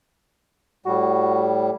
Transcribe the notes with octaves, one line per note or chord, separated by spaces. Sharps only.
A2 G3 F#4